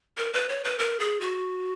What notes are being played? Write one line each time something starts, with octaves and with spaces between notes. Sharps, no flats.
A#4
B4
C#5
B4
A#4
G#4
F#4